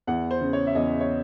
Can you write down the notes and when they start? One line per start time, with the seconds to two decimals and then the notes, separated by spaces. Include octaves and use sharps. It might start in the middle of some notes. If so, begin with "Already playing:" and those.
0.07 E2 F#5
0.31 C5
0.41 C#3
0.53 C#5
0.67 E5
0.75 E2 D#5
1.00 C#5